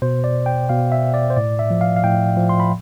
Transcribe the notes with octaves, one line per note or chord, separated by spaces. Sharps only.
B2 C5
D5
G5
B2 F5
E5
D5
C5
A2 D5
E5
F3
F5
F5
A2 G5
F3
C6
B5